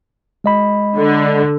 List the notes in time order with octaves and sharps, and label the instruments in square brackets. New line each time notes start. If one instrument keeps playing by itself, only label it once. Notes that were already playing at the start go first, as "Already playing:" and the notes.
[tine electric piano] G#3 D#5 B5
[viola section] D3